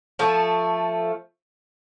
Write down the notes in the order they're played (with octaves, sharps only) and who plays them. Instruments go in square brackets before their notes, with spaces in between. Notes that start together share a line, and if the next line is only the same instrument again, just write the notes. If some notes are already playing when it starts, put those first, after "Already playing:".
[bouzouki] F3 A3